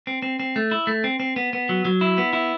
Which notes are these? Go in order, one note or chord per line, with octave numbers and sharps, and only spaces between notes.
C4
C4
C4
A3
E4
A3
C4
C4
B3
B3
F#3
F#3
E4
B3
E4